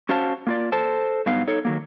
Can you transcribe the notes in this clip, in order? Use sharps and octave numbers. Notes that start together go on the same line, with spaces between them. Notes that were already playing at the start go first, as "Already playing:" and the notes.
C#4 F#4 C5 F5 A5
A#3 F4 D5
A4 C5 A5
G2 F#3 B3 D#4 F5
D#4 A4 C#5
D#3 F#3 A#3